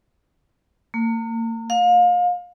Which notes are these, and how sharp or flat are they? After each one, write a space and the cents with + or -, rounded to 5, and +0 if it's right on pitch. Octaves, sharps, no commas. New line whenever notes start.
A#3 -40
F5 +30